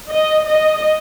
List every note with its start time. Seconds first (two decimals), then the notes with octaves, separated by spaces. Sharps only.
0.11 D#5
0.47 D#5